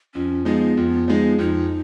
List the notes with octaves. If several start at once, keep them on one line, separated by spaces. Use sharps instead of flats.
F2 C#4
F3 G#3 B3 D#4
F2
F3 G#3 D#4
F2 D#4